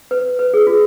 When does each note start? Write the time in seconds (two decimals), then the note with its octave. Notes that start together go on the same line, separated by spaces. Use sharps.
0.11 B4
0.39 B4
0.54 G#4
0.67 F4